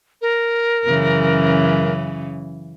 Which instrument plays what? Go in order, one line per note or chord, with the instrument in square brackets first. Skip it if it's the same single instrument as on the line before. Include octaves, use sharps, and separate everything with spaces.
[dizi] A#4
[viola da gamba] F#2 C#3 E3